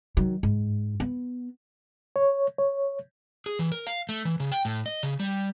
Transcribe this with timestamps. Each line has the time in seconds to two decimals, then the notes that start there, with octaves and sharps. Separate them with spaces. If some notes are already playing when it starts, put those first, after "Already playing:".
0.17 D#3 F#3
0.43 G#2
1.00 B3
2.16 C#5
2.58 C#5
3.46 G#4
3.59 E3
3.72 A#4
3.87 F5
4.09 A3
4.25 E3
4.40 C#3
4.52 G5
4.65 A2
4.86 D#5
5.03 C#3
5.20 G3